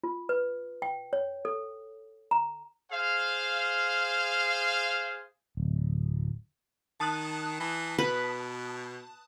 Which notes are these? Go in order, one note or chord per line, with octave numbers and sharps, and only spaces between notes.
F4
B4
G5
C#5
A4
A#5
G#4 C5 F5
D1
D#3 A5 D#6 F#6
E3
B2 B4